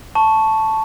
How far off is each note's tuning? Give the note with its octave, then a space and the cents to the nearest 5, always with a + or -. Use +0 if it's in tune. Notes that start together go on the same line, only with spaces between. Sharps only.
A5 +0 C#6 +0